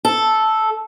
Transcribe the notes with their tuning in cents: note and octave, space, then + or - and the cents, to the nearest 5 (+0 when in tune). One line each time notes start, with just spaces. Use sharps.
A4 -5